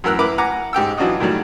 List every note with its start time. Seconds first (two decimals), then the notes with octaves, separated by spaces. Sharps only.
0.04 F#2 E3 A#4 E6 F#6
0.19 E4 A#4 B4 B5 D6
0.38 F#5 G#5 A#5 D6
0.73 G#2 G4 G5 E6
0.98 E3 F#3 D4 F4 F#4 D#5
1.20 A2 D#3 F#3 G3